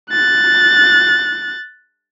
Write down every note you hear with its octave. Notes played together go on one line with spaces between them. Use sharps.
F#6 A6